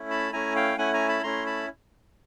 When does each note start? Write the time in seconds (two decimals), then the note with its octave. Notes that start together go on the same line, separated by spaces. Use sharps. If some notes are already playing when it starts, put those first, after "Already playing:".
Already playing: A3 C#4 E4
0.10 A5 B5
0.32 A3 C#4 E4 G#5 A#5
0.56 F5 G5
0.78 A3 C#4 E4 F#5 G#5
0.93 G#5 A#5
1.08 A5 B5
1.23 A3 C#4 E4 A#5 C6
1.46 A5 B5